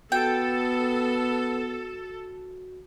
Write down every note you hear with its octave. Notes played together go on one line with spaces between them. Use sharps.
B3 F#4 A4 G5